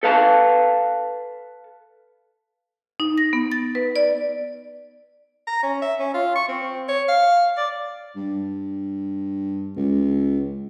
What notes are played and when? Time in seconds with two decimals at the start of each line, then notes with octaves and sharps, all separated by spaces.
0.03 A4 B4 F5 A5
3.00 D#4
3.18 A#6
3.33 B3
3.52 A6
3.75 B4
3.96 D5
5.47 A#5
5.63 C#4
5.82 E5
6.00 C#4
6.14 F4
6.35 C#6
6.48 C4
6.88 C#5
7.08 F5
7.57 D5
8.16 G2
9.76 C#2